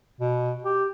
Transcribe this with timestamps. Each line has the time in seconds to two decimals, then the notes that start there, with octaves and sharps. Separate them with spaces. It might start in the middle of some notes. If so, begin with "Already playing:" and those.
0.21 B2
0.64 G4